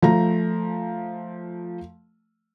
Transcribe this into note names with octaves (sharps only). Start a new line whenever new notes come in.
F3 A3 A#5